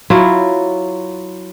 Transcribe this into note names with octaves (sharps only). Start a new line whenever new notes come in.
F#3 E4 F4